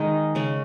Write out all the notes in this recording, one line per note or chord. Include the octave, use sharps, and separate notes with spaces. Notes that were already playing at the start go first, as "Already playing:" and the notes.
Already playing: D#3 G#3 D#4 G#4
C#3 G#3 C#4